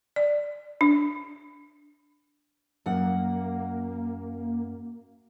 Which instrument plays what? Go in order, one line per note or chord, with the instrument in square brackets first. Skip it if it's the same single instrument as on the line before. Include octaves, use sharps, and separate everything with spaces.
[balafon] D5
D4
[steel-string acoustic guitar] F#2 F#5 [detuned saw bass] A#3